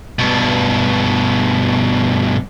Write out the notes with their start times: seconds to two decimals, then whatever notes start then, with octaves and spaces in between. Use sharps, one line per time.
0.19 G2 B2